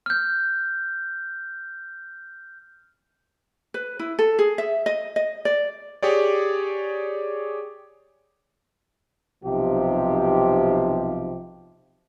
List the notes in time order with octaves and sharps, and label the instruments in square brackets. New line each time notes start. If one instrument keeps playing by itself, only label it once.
[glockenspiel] F6 G6
[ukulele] B4
E4
A4
G#4
E5
D#5
D#5
D5
[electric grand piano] G4 G#4 C#5 D5
[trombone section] B1 C3 F3 D#4 G4